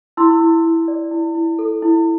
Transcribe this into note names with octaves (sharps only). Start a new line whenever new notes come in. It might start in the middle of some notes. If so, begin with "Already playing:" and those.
E4 C6 E6
E4
E4
D5
E4
E4
A4
E4